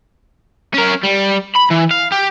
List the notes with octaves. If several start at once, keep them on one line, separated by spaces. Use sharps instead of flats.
C#4 A#4
G3
B5
E3
F5
G4